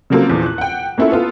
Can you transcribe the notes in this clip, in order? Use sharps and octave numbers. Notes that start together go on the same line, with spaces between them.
C#3 F3 F#3 A#3 C4 A4
E2 A#2 F3
F#6
F#5 G5
A#3 C#4 E4 F4 A4
B3 F4 A4